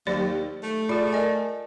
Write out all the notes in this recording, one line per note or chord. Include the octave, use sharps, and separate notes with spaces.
D#2 F#3 G4 D5
A3
F4 G#4 D5
A#4 D#5 G#5